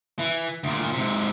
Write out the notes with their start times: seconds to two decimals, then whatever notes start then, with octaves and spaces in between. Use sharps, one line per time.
0.19 E3
0.64 D2 A#2
0.93 G#2 C3